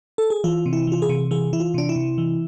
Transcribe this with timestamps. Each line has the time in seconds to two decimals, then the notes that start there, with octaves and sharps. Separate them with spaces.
0.18 A4
0.30 G#4
0.44 E3 F4
0.66 C3
0.73 E4
0.87 E3 F4
1.02 G#4
1.09 C3
1.31 E3 G#4
1.53 E3 E4
1.60 F4
1.74 C3 D4
1.89 E4
1.96 C3
2.18 E3